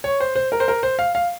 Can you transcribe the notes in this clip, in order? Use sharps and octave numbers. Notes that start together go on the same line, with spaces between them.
C#5
C5
C5
A#4
C5
A#4
C5
F5
F5